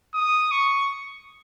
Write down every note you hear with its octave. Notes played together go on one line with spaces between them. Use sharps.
D#6
C#6